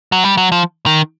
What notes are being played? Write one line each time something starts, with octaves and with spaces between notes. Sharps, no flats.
F#3
G3
F#3
F3
D#3